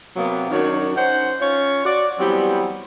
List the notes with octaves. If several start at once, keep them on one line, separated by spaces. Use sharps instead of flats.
C3 F#3 A#3 B3
F#2 D#3 F#3 D4 C#5
C#4 D#4 C5 F#5
C#4 F4 C#5
F#4 D5
E3 F#3 G3 B3 C4